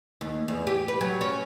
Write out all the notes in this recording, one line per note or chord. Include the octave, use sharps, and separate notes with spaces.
D#2
E2
G4
B4
F#3
C#4